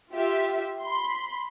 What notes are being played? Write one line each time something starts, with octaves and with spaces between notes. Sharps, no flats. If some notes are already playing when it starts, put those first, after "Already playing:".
F4 G4 E5
B5 C6